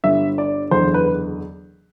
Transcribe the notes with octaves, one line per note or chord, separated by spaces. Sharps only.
G1 G2 D3 E5
D5
F#1 E2 D3 C5
B4